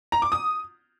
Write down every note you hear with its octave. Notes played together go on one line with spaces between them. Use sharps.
A#5
D6
D#6